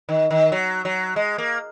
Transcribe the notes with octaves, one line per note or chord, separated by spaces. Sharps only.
D#3
D#3
F#3
F#3
G#3
A#3